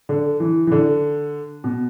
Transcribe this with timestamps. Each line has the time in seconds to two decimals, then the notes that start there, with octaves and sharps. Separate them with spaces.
0.09 D3
0.40 E3
0.67 E3
0.72 D3
1.64 B2